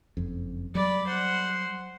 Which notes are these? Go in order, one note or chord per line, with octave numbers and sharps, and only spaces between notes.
F#1 F2
F#3 G3 D5 B5
C5 F#5